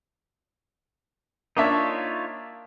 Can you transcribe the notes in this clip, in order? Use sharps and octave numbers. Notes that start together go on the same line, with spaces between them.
A#3 D4 D#4 F4 C#5 E5